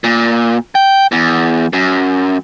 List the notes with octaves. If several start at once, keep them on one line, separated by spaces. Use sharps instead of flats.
A#2
G5
E2
F#2